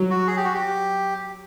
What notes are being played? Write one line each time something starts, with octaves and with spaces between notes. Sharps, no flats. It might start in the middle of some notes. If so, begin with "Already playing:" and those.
Already playing: F#3
F#4
G#4
G4
F#4
G4